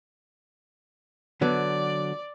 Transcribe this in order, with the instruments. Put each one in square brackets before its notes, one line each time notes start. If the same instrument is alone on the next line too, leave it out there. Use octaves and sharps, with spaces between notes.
[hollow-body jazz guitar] D3 F#3 B3 [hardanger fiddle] D5